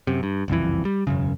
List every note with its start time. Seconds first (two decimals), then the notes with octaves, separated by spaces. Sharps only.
0.07 F#2 C3
0.23 G2
0.48 F#1 C2 F2 E3
0.85 G3
1.07 E1 F#2 C#3